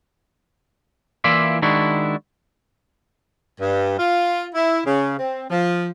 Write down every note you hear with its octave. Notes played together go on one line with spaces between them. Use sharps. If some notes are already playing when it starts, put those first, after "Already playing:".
E3 A#3 E4 F4 D5 E5
D#3 G#3 D4 E4 F#4
G2
F4
E4
C#3
C4
F3